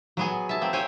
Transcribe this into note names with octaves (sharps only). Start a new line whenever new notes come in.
F#3 B3 G#4
E5 A5
A#3 C4
C5 C#5 G5 G#5